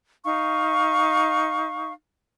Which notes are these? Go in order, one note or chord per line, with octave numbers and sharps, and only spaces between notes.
D#4 F5 C#6